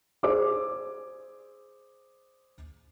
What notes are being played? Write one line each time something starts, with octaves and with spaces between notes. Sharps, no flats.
G#4 C5 D5 D6 E6